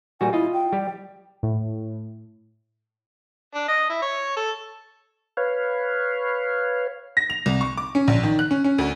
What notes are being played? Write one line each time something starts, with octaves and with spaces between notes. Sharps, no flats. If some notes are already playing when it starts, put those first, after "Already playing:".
A#2 G3 F#4 G#5
E4 F4 D#5
G5
G3 G4
A2
D4
D#5
E4
C#5
A4
B4 C#5 F5
A#6
F7
C2
C#6
D6
C#4
A#1
D#3
F#6
C#4
C#4
D2